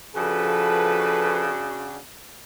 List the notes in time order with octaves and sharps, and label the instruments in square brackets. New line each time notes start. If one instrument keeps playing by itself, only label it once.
[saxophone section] C#3 D4 F#4 [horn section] F3 A4 B4